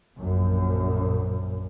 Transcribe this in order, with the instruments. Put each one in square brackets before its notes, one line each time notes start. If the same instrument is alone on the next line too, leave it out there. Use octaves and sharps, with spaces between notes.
[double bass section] A#1 F#2 A#2